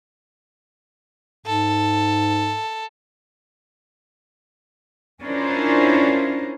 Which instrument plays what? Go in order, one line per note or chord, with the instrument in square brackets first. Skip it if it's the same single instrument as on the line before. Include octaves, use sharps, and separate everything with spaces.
[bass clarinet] G#2 [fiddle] A4
[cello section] C#4 D4 E4 F4 A#4 C5